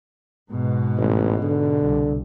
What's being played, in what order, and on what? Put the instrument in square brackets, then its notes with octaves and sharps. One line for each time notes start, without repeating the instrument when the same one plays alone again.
[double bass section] G#2 B2
[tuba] A1
D3
[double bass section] C2